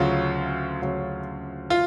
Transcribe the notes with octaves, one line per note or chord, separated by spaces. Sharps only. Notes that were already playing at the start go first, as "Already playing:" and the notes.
Already playing: D2 C#3 F#3 F4
D2 C#3 F#3
F4